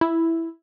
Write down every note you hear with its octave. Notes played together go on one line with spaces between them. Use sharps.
E4